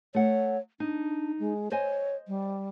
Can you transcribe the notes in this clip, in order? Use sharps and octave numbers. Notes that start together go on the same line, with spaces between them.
A3 C#5 F#5
D4 D#4
G#3
C5 C#5 D#5 G#5
G3